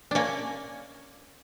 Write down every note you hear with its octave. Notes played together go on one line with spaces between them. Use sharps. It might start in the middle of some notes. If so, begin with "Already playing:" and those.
A#3 C#4 D4